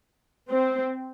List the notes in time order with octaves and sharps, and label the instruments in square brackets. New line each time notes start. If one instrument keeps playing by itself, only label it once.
[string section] C4